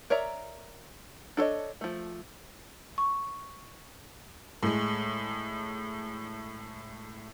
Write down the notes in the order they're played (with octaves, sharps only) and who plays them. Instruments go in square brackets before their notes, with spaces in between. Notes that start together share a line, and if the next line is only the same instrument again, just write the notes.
[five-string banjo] A#4 C#5 D5 E5 A#5
D4 A4 C5 C#5 D#5
F3 A3
[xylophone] C#6
[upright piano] A2 G#3